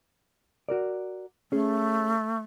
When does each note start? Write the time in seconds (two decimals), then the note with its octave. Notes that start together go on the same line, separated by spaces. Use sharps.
0.69 F#4 A#4 D5
1.52 A3 C#4 G#4